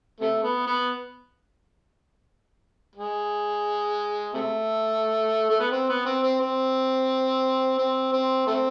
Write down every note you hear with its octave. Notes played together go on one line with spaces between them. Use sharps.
C3 A3
B3
B3
G#3
C3 A3
A3
B3
C4
B3
C4
C4
C4
C4
C4
A3 C4